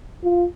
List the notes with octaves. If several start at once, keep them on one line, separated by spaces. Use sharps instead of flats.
F4